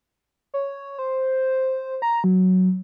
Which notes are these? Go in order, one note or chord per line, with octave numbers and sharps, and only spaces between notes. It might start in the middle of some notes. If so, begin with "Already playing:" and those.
C#5
C5
A#5
F#3